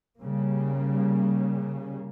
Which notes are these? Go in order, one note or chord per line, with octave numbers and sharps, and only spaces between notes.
C#3 G3 A#3